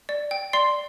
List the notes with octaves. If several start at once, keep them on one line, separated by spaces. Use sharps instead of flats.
D5
G5
D5 C6 C7